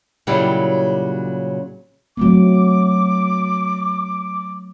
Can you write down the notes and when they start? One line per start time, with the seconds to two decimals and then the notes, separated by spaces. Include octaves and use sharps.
0.27 A#2 C#3 F#3 G3 E4 G4
2.17 F#3 A3 C4 D6